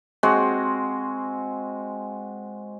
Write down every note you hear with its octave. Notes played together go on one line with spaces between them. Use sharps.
G#3 C4 F#4